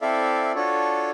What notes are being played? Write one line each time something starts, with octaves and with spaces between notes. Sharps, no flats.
C4 E4 A4 D5 E5 F5
D4 F4 F#4 A4 C#5